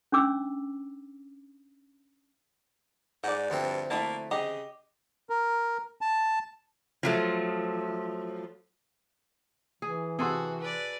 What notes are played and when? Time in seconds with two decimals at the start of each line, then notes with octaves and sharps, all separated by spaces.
0.12 C#4 D4 D6 E6
3.24 G#2 D5 F#5
3.50 D2 G2 F3 C4
3.90 A3 A#3 E4 A5
4.31 C#3 G4 D#5
5.30 A#4
6.01 A5
7.03 F3 F#3 A3
9.82 E3 G#4
10.19 C3 F#4 G#4 A4 C6
10.60 B4 D5